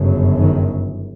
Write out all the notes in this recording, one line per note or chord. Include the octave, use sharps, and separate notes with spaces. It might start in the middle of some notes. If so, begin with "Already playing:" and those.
Already playing: G1 F#2 C#3
D#3